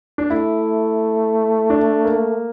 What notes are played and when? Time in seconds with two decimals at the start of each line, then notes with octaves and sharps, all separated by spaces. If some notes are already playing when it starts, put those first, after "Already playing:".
0.18 D4
0.30 A3 E4
1.70 D4
2.05 A#3